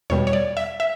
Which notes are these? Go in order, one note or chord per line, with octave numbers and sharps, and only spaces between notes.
E2 B2 G3 C#5
C#5
D5
E5
E5